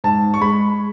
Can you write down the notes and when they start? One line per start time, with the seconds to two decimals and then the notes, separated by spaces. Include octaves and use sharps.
0.04 G#2 A5
0.34 C#6
0.41 G#3 B5